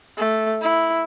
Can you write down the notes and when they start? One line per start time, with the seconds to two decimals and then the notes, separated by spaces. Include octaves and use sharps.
0.18 A3
0.62 E4